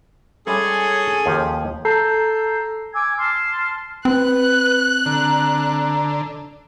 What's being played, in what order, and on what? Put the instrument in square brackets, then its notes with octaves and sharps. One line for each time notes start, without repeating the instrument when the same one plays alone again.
[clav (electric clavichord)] G3 G#3 E5 [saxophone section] C#4 G#4 A4 [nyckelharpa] G#5
[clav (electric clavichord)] D#2 F3 G4
[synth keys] A4 A5 A#5 E6 G6 C7
[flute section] G#5 D6 E6 G#6
A5 C6 F6
[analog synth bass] C4 [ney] B4 [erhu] F#6
[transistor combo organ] D3 [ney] A#5